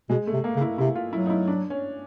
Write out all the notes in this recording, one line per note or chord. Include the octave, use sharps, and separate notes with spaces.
B2 G#3
A3
C3
A#3
C#3
E4
C3 E4
F4
F#3 E4
D#4
E4
D4
C#4